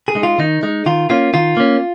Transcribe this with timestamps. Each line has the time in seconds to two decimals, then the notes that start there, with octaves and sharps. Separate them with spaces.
0.08 G#4
0.15 G#3 D#4
0.23 F4
0.38 D#3 D#4
0.63 G#3 D#4
0.86 D#3 F4
1.10 A#3 C#4 F4
1.34 D#3 F4
1.57 A#3 C#4